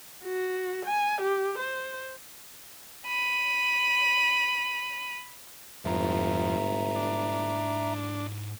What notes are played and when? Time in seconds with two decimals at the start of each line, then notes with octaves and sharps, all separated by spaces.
0.24 F#4
0.86 G#5
1.21 G4
1.59 C5
3.07 B5 D#7
5.85 G1 F2 G#2 E4 E5 A#5
6.96 D4